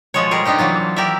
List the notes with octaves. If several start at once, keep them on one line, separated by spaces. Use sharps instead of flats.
B2 F3 G#3 C#5
G3 G#4 A#4
C3 D4 D#4 G4 C5
E3 F#3 A#3 F4
G4 A#4 D5 E5